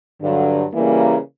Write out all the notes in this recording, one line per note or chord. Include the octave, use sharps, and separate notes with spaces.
G2 D3 F#3
C#3 E3 G3 A#3